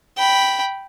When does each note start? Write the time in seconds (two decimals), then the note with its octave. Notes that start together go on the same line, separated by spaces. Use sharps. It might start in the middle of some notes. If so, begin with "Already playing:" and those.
0.18 G5 B5